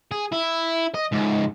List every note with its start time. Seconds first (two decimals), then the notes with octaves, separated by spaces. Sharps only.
0.11 G#4
0.32 E4
0.94 D#5
1.12 C#2 G#2